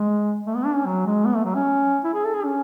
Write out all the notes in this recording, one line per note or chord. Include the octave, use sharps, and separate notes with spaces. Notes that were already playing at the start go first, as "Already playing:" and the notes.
Already playing: G#3
A3
B3
D4
C#4
F#3
G#3
B3
A3
F#3
C#4
E4
G#4
A4
G#4
C#4